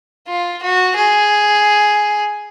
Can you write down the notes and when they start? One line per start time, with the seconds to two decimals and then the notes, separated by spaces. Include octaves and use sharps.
0.28 F4
0.63 F#4
0.97 G#4